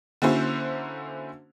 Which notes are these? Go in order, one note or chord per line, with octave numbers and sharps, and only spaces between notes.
D3 A#3 C#4 E4 F#4 C5